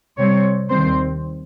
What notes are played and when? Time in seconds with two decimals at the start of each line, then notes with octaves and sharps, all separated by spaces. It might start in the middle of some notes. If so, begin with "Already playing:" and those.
0.18 C3 G3 C4 C#5
0.69 D#2 D#3 G3 C4 C5